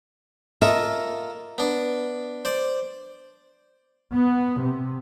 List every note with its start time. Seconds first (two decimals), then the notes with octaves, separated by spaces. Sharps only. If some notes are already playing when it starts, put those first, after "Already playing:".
0.62 A#3 F4 A4 D#5 E5
1.58 B3 D4
2.45 C5 D5
4.12 B3
4.60 C3